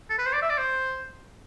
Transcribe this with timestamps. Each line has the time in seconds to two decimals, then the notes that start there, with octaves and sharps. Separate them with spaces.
0.10 A4
0.18 B4
0.26 C5
0.34 D5
0.42 E5
0.50 D5
0.58 C5